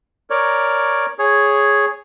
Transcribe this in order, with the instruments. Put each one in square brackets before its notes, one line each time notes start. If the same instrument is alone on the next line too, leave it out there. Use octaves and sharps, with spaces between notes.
[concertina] A#4 C#5 D5
G#4 C#5